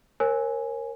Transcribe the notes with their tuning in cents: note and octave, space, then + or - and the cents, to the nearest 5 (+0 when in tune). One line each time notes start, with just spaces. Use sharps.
A#4 +0 C#5 -40 G#5 +0